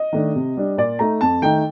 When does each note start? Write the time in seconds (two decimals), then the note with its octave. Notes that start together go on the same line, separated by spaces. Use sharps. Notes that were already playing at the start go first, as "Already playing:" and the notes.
Already playing: D#5
0.13 D#3 A3 D4
0.35 C3
0.57 G3 D4
0.77 A#2 D5
0.99 A3 D#4 A#5
1.21 F2 A5
1.42 D#3 A3 D#4 G5